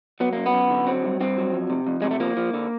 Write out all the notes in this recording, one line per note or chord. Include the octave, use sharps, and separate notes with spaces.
F#3 B3
F#2 A#3
B3
F#2
D3
F#3 C4
G2
G2 C4
F#3
F2
C3
F2
C3 G#3
A3
F3 A#3
F3
D3